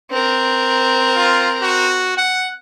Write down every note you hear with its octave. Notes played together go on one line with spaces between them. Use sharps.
C4 A#4
F4
F#4
F#5